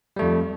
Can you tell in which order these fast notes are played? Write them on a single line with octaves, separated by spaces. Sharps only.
G3 A3 F2